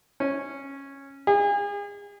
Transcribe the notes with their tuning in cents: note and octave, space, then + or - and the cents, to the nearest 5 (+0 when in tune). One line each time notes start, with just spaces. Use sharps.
C#4 -10
G#4 -35